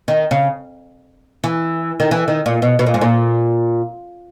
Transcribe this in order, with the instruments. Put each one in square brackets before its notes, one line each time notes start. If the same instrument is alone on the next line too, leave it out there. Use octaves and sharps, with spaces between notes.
[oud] D#3
C#3
E3
D#3
E3
D#3
A#2
B2
B2
A#2
G#2
A#2